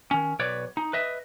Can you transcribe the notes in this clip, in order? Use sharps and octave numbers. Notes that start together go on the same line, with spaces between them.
D#3 C#4
B1 B4 C#5 D5
D#4
B4 D#5 E5